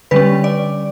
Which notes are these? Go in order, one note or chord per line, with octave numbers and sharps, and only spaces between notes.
D3 G3 C#4 B4
D5